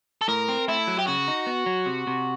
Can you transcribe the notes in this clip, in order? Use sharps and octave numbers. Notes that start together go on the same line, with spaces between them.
A4
A2 A#4
C4
A3 E4
F#3
G4
C#3 F#4
D#4
B3
F#3
C3
C3